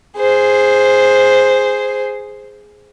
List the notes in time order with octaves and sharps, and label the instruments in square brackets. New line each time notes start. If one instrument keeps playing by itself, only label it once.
[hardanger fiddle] G#4 C5